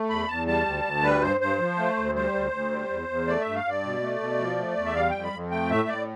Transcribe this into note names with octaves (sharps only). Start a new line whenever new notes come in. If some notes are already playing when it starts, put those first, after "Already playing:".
Already playing: A3
E2 B5
E2 A5
G3 A5
D2
D2
G3 B4
G2 C5
G2 C5
F3
A3
D2
G3 C5
D2
D2
G3
E2
E2
A3 D5
E5
G2
F5
G2 D5
B2
A3
B2
F3
A3
E2
E5
G3 F5
F2 G5
B5
F2
A3 G5
A2 E5
A2 D5